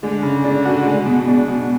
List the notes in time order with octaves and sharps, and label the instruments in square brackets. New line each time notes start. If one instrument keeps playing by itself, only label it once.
[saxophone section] D3 [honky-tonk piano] G#3
[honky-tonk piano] C#3
D4
F#4
G#3
B2
D4
B2